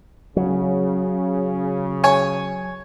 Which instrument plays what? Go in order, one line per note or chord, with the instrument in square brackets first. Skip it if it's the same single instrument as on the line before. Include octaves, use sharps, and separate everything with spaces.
[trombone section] C#3 [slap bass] F#3
[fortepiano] C#5 G#5 C#6